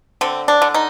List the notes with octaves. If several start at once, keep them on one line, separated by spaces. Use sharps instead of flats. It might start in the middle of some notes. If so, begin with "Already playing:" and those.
D3 C4
D4
D3
D#4